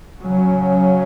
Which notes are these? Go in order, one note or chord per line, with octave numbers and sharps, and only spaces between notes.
C#3 F#3 C#4